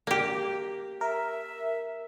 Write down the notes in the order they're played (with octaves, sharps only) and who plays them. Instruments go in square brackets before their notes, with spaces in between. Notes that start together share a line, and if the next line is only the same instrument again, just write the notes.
[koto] A#3 G4
[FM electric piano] A#4 [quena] E5